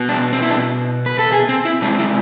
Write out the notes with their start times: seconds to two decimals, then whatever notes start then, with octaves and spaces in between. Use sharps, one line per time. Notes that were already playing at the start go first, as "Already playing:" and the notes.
Already playing: B2 B3
0.09 D4
0.33 C4
0.42 E4
0.49 D4
1.06 B4
1.19 A4
1.32 G#4
1.49 C4
1.65 E4
1.82 C3 G#3 C4 D4
1.99 E4